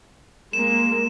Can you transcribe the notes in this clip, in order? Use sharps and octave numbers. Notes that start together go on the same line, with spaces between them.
G#3 A#3 E7